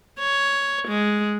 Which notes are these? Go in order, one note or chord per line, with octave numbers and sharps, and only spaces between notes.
C#5
G#3